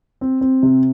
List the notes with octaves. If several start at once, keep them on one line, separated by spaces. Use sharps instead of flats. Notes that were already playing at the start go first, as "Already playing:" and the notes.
C4
C4
C3